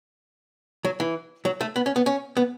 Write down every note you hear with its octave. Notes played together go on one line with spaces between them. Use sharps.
F#3
E3
F#3
A3
B3
C#4
B3
C#4
B3